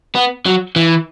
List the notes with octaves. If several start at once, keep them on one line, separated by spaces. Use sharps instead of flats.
B3
F#3
E3